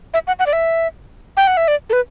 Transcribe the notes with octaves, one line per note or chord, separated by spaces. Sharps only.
E5
F#5
F#5
D5
E5
G5
F#5
E5
D5
A4
B4